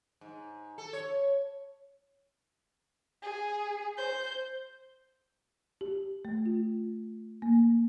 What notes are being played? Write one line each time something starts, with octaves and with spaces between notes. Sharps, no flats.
G#2
A4
C#5
G#4
C5 G6
G4
A3
F4
A#3